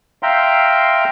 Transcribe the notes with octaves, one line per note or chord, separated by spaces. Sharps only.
E5 F5 G5 A#5 C6